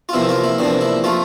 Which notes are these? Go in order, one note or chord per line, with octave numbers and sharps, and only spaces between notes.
F4
E2 C3 F3 A#3 E4
F4
E4
E2 C3 F3 A#3 D4
E4
F3 A3 F4